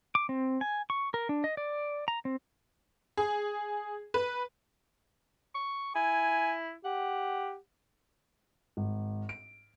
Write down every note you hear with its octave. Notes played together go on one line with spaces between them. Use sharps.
D6
C4
G#5
C#6
A#4
D4
D#5
D5
A#5
C4
G#4
B4
C#6
E4 G#5
G4 F#5
G#1
D7